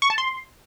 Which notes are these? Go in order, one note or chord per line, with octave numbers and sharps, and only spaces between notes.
C#6
A5
C6